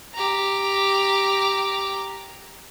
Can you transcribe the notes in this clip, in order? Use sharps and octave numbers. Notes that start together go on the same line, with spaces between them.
G4 A#5